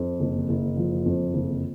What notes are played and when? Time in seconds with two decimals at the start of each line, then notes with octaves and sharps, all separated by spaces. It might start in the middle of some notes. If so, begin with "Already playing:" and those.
Already playing: F2
0.20 F#1
0.49 F#1
0.77 F3
1.06 F2
1.34 F#1